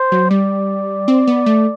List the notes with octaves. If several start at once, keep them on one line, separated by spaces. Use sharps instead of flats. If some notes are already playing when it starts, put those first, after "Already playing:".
Already playing: C5
F#3
G3 D5
C4
B3
A3